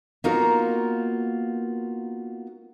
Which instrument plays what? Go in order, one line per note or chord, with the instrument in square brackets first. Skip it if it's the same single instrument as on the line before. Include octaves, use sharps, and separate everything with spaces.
[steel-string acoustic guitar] A#3 B3 D#4 F4 F#4 A#4